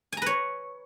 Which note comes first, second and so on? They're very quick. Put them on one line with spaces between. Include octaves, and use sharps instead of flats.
G#5 A#5 B4 C#5